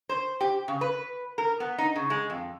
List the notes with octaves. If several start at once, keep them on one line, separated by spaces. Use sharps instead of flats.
C5
G4
C#3
B4
A#4
B3
D#4
C#3
G#3
F2